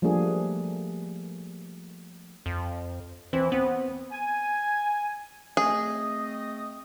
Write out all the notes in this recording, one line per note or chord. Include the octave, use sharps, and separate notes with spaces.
F3 G3 A3 A#3 D4 G#4
F2
E3 C4
B3 C4
G#5
A3 C4 G#4 D#5